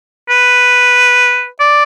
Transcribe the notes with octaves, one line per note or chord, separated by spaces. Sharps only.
B4
D5